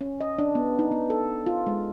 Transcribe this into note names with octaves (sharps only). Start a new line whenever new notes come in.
C#4
D#5
D4
B3
D#4
B3
A4
F4
G#3